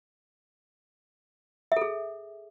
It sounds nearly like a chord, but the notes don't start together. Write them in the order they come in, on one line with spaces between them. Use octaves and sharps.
E5 A4 G#4